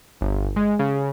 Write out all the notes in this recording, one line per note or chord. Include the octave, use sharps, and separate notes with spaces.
G1
G#3
C#3